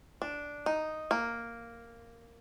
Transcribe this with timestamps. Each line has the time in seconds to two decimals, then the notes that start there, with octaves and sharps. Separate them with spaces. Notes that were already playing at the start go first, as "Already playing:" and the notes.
0.22 D4
0.66 D#4
1.11 A#3